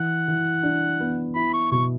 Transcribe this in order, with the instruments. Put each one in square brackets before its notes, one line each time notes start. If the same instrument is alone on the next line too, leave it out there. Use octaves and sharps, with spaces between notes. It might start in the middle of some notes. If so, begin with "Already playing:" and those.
Already playing: [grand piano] E3 [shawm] F#5
[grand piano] E3
D4
B3
[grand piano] E4 [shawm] B5
[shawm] C#6
[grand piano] B2 [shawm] C#6